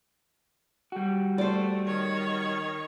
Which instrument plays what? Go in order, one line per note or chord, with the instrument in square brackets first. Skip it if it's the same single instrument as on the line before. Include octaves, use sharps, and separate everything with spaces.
[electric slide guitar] G3 F#4
[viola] A3 [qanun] C5 D5
[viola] D#3 C#5